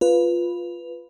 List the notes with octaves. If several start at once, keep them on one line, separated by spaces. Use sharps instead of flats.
F4 B4